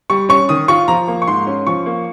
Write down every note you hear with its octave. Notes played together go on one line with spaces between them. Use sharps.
G3 C#6
C#4 C#6
D#3 D#6
F4 C#6
F3 A#5
A#3
C#6
G#2 C6
C#4
F3 C#6
A#3